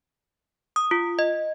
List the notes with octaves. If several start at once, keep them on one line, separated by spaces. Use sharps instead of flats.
D#6
F4
D#5